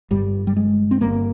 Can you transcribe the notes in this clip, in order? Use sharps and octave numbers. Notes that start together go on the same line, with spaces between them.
G1 G2 G3
G3
G#3
C4
G1 G2 A#3